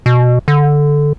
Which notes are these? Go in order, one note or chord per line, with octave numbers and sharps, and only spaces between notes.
B2
D3